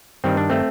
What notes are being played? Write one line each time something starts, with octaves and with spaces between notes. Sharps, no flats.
G2 D#3 G3 C4
D4
A3 C4